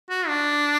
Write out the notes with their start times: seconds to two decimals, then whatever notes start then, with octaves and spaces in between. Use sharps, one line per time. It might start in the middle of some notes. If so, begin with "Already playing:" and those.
0.09 F#4
0.27 D4